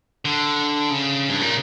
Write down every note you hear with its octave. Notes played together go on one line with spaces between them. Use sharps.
D3
C#3
G2
A#2